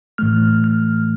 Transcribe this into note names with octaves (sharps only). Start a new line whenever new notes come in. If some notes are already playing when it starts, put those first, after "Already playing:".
A2 E3 A3 F6
F6